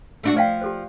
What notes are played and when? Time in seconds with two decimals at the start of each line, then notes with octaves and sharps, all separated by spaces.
0.23 A3 D4 F#4
0.36 F3 D5 F5 G5
0.62 G4 A4 C5